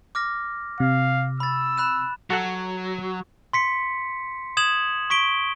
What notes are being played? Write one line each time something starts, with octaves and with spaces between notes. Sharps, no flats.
D6 F6 A#6
C3 F5
B5 E6 A6
B5 F#6 E7
F#3 F#4 A4 F#5
C6 B6 C#7
D#6 G#6 E7 F#7
C#6 B6 D7 G7